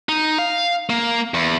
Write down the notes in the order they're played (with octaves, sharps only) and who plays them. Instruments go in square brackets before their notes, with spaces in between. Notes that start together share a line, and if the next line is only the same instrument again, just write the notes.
[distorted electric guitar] D#4
F5
A#3
E2